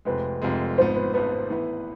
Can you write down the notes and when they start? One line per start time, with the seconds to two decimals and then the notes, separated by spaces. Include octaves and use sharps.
0.05 F1 F2 C3 G#3 B4
0.42 F1 F2 C3 G#3
0.78 G#1 G#2 F3 B3 C5
0.96 B4
1.13 G#1 G#2 F3 B3 B4
1.50 A2 E3 B3